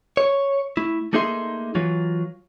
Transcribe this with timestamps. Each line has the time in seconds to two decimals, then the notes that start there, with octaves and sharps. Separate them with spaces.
0.17 C#5
0.77 A3 E4
1.13 A3 A#3 D#4 G#4 E5 C6
1.75 E3 F#3 F4